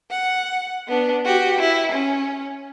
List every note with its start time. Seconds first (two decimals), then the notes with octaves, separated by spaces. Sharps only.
0.11 F#5
0.88 B3 D4
1.25 F#4 G4
1.59 E4
1.92 C#4